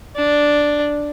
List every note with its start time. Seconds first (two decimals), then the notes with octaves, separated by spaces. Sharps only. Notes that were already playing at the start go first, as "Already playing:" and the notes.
0.16 D4